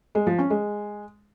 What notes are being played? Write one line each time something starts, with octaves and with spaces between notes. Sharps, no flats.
G#3
F3
C#4
G#3